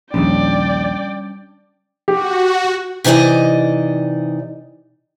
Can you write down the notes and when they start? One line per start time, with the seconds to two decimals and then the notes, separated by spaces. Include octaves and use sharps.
0.14 A#1 D#2 G3 C#4 D4 D5 G5
2.08 F#4 G4
3.04 C3 E3 D#4 D5 D#5